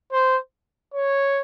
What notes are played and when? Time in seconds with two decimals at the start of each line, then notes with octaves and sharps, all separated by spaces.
0.12 C5
0.94 C#5